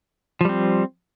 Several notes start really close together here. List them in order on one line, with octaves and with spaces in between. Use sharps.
F3 G3 C4